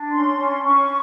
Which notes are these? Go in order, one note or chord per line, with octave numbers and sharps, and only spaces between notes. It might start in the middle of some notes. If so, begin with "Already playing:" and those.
Already playing: D4
C#4 C6
C#4
C#4 C#6